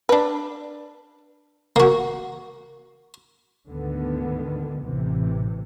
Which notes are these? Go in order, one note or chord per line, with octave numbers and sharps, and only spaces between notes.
D4 B4
A#3 F#4
D2 G#2 D3 D#3 B3
A1 C3 E3